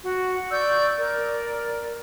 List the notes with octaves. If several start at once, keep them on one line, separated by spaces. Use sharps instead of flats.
F#4
D5 C#6 E6 G6
A#4 D5